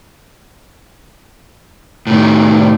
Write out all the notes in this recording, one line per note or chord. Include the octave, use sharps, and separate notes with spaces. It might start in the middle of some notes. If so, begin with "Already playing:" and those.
A2 D#3